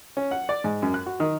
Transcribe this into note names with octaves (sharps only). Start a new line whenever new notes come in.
C#4
F#5
D5
G#2
F#2
F#6
F#4
D#3